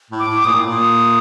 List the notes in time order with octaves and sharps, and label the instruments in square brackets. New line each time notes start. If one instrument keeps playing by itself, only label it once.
[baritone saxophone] A2
[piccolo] D6
[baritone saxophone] A2
[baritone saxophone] A#2 [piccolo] D#6
[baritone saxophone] A2 [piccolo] D6
[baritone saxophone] A#2
[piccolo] D#6